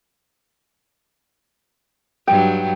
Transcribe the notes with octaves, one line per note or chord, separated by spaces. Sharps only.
G2 F#3 G5